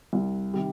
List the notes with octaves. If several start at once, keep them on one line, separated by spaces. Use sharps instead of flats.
C2
C3 D#3 G3